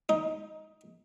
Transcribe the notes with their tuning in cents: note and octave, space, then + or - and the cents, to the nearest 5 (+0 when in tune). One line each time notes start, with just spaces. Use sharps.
D#4 +15